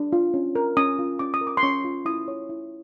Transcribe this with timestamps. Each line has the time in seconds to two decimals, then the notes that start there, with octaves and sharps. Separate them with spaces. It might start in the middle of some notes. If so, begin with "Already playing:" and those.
Already playing: D4
0.13 F4
0.34 C#4
0.55 A#4
0.77 C#4 D#6
0.99 F4
1.19 C#4 D6
1.34 D#6
1.41 A#4
1.47 D6
1.57 C6
1.63 C#4 C#6
1.84 F4
2.05 E4 D#6
2.28 C#5
2.49 E4